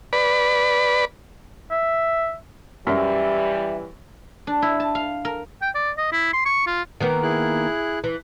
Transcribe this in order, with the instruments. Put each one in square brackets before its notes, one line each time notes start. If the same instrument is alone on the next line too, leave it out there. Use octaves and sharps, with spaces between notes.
[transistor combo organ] B4 D5 B5
[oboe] E5
[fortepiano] F#2 A#4 [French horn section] E3 G3 [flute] E5
[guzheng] D4
E4
A5
F5
A#4
[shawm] G5
D5
D#5
E4
C6
C#6
F4
[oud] D#3 A#3 B3
[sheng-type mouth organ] E4 G#4 F#6
[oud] E3